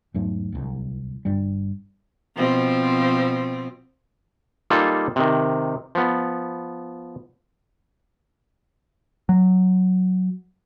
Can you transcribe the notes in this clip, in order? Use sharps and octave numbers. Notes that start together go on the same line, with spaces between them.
E2 G#2 F#3 A3
D1 C2
G1 G2 G3
B2 F3 C4
G3 A#3 D#4 F4 A4
C3 D#3
F3 B3
F#3